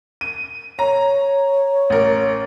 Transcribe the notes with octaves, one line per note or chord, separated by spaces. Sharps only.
D#7
C#5 A#5
A1 A#4